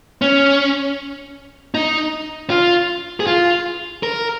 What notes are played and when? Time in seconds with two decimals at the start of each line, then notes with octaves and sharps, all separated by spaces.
0.22 C#4
1.74 D#4
2.50 F4
3.20 G#4
3.27 F4
4.03 A#4